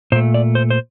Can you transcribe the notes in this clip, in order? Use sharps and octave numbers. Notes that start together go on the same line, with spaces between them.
A#2 A3 C5
D5
C5
C5